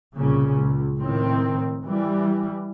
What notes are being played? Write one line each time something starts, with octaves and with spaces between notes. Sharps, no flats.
C2 A#2 C#3
C#2
A2 D#3 C4
E3 G3